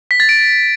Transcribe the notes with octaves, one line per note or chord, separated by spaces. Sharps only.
B6
A6
D7